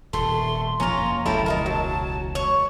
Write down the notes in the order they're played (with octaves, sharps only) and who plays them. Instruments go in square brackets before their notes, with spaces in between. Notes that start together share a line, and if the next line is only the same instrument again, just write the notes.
[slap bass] D#1 [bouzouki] A3 [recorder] C6
[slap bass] F1 F3 A#3 [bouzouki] C#4 F4 [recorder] A#5
[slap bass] E1 C#2 A#2 [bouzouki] A3 E4 G4 [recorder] A5
[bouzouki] D#4 F4 A#4
F#3
C#5